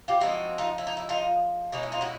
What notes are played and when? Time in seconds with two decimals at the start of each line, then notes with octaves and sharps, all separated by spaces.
0.08 F4 G4
0.20 F3 G#3 C4 D#4 E4 F#4
0.58 D#4 F4
0.78 E4
0.87 D#4
0.97 E4
1.09 D#4 F4
1.72 B2 G#3 C#4 D#4
1.83 E4
1.92 D#4 F4
2.01 E4 F#4